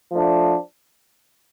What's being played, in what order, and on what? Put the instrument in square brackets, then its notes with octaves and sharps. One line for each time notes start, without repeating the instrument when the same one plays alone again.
[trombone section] F3 A3 D4